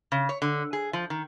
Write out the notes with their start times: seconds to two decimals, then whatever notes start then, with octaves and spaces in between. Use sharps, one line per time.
0.12 C#3
0.29 C#5
0.42 D3
0.73 G#4
0.93 F3
1.10 D#3